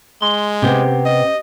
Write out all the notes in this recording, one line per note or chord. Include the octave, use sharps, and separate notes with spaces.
G#3 C6
C3 B3 C#4 G4 C5
D#5